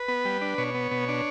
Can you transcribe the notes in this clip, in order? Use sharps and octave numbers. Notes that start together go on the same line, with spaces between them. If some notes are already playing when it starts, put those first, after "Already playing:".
Already playing: B4
B3
G3
D4
B2 C#5
B3
B2
D4